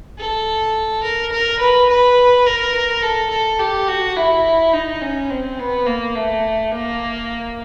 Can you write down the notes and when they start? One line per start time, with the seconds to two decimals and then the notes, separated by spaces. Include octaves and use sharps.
0.18 A4
1.03 A#4
1.32 A#4
1.60 B4
1.89 B4
2.46 A#4
3.02 A4
3.30 A4
3.59 G4
3.88 F#4
4.16 E4
4.73 D#4
5.01 C#4
5.29 C4
5.59 B3
5.86 A#3
6.15 A3
6.71 A#3